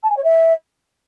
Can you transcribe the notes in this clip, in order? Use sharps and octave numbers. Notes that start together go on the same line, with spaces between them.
A5
G#5
C#5
E5